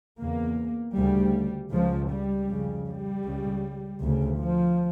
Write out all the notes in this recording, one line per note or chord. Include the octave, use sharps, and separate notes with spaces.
E2 C#3 A#3
D2 C#3 G3
C#2 C#3 F3
G3
F2 C#3
G3
C#2 C#3
D2 C#3
F3